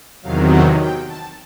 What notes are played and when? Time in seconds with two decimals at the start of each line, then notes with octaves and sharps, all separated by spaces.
0.22 E2 C3 D#3 F#3 F5
0.51 F#5
0.79 G5
1.07 A5